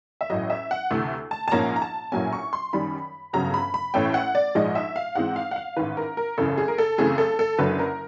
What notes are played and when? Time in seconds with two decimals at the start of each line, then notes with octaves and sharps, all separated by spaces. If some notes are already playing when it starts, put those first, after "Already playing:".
0.21 E5
0.30 A1 A2 F#3 D#5
0.50 E5
0.71 F#5
0.91 D2 C3 E3 A3
1.31 A5
1.48 A5
1.51 A#1 G#2 F3 A#3 C#4 A#5
1.76 A#5
1.82 A5
2.12 A#1 A2 F#3 A#3 C#4 G#5
2.33 C#6
2.53 C6
2.73 F#2 D#3 G3 B5
3.33 G1 F2 C#3 F#3 A#5
3.54 B5
3.74 B5
3.94 A1 A2 E3 A3 C#4 G5
4.14 F#5
4.35 D5
4.55 A#1 G#2 F3 G#3 D#5
4.75 E5
4.96 F5
5.15 G#2 E3 G#3 C4 F#5
5.36 F5
5.51 F#5
5.56 F5
5.77 A1 G#2 D#3 B4
5.97 A#4
6.17 A#4
6.38 G#1 F#2 C#3 E3 A4
6.58 G#4
6.68 A#4
6.78 A4
6.98 F#2 C#3 E3 A3 C4 G#4
7.18 A4
7.39 A4
7.59 F#1 F#2 D3 F#3 B4
7.79 A#4